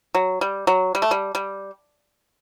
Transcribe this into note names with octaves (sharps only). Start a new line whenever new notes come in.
F#3
G3
F#3
G3
A3
G3
G3